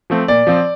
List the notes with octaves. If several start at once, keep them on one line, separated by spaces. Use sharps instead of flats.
F3 A3 C4
A#2 D5
F3 C4